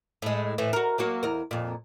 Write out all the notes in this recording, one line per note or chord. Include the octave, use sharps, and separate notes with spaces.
A2 G#3
A2 E3
F#4 A#4
F#3 A#3 F#4
E2 A#4
F2 A#2